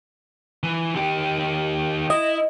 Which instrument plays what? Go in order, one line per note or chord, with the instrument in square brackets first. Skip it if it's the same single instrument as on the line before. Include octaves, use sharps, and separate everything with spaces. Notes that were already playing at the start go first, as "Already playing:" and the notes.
[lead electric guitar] E3
D#3 G4
[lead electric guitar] E4 [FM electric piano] D#5